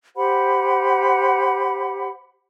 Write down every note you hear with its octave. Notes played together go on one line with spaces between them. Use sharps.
G4 C5 F#5 B5